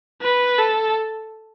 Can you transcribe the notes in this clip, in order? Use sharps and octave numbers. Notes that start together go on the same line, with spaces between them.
B4
A4